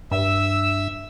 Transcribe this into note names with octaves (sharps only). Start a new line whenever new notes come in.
G2 E5 E6